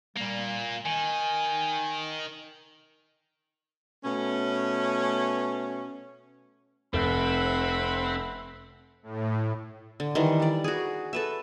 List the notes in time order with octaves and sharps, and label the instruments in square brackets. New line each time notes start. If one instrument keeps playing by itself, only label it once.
[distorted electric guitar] A#2 A#3 [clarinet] G3
[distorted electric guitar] D#3 [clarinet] G#5
[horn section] B2 A3 C#4
[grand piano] F1 [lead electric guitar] C4 [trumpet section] E5 F#5 B5
[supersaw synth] A2
[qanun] D3
D#3 E3 G3
D4 D5
F#4 G#4
A4 B4 E5